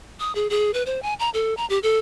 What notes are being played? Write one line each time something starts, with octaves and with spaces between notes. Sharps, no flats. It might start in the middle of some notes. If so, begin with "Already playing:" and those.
D#6
G#4
G#4
B4
C5
G#5
A#5
A4
A#5
G4
A4